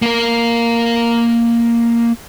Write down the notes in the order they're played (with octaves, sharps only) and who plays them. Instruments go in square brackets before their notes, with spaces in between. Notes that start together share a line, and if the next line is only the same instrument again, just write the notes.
[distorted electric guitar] A#3 A#4